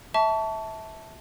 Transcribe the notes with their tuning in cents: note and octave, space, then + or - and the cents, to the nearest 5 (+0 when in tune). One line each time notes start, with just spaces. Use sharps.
E5 -20 A5 +0 C#6 +35